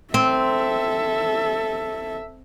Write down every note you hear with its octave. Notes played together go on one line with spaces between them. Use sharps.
C4 A4 E5